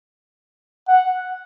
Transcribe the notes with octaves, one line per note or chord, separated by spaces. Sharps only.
F#5